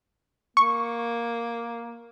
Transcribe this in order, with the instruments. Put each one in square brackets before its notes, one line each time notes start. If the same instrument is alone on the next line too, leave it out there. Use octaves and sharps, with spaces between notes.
[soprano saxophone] A#3 [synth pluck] C#6